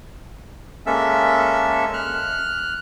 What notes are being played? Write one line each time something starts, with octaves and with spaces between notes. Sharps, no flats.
G#3 A#3 C#4 A4 E5 E6
F6 F#6